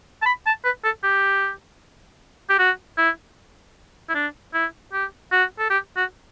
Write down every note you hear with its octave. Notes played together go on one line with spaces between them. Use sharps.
A5
B5
A5
B4
A4
G4
G4
F#4
E4
E4
D4
E4
G4
F#4
A4
G4
F#4